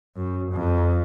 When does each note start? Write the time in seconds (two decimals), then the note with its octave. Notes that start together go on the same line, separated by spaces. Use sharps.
0.16 F#2
0.52 F2